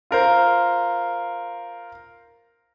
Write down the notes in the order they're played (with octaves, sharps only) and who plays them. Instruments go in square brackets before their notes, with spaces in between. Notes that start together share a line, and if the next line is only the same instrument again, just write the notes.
[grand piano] F4 A#4 C5